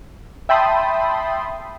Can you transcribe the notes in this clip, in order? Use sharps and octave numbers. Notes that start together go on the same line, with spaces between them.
E5 G5 A5 B5 C6 D#6